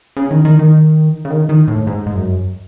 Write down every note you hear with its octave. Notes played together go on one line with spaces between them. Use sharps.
C#3
D#3
D#3
D#3
C#3
D#3
D#3
A2
G#2
G#2
F#2